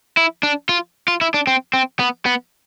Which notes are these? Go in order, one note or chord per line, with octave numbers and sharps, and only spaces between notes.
E4
D4
F4
F4
E4
D4
C4
C4
B3
B3